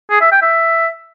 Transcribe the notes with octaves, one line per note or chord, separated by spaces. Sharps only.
G#4
E5
G5
E5